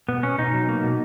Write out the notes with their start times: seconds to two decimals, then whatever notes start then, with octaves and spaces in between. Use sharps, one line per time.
0.08 B2 B3
0.23 B2 C#4
0.38 B2 D#4
0.54 F#3
0.68 A#3
0.83 B2